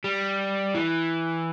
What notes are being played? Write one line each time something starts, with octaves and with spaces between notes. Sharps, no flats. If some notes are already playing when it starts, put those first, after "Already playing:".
G3
E3